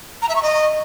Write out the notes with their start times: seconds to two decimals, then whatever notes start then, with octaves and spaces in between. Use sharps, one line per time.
0.22 A#5
0.29 E5
0.36 C#6
0.42 D#5